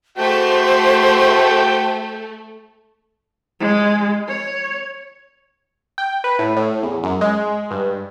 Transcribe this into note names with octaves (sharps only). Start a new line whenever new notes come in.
A3 F#4 C5 G5
G#3
C#5
G5
B4
A2
A2
E2
F#2
G#3
G2